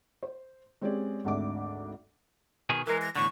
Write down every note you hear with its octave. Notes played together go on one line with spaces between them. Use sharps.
C5
G#3 C4 C#4 G4 G#4 D5
G#1 D2 G#2 D4 E5 D6
B2 D#3 G#4
E3 G#3 A#4
A#6
E2 A2 D3 C#6